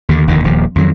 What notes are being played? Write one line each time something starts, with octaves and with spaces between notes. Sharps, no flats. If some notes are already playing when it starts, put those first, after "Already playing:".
D#2 D3
F1 D#2 D3 D#3
D#1 D#2 F3
F2 D#3 F#3